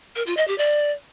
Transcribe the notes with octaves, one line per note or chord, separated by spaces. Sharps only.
A#4
F4
D#5
G4
D5